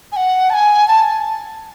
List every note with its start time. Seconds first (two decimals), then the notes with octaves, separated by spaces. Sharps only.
0.12 G#5
0.16 F#5
0.50 A5
0.54 G#5
0.88 A5